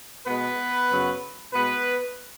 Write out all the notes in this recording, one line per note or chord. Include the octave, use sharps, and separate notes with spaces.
B2 G#3 B3 B4
F#2 C#3 F#3
B2 G#3 B3 B4